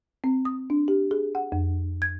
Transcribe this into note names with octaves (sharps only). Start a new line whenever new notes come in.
C4
D#6
D4
G4
G#4
F#5
F2
G#6